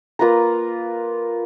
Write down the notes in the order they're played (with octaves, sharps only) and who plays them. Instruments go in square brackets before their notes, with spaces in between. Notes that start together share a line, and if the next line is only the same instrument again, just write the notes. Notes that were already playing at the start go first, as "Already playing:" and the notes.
[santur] A#3 F4 B4 A#5